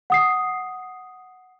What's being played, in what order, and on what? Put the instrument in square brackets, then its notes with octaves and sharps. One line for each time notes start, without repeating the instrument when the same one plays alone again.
[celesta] F#5 D#6 C7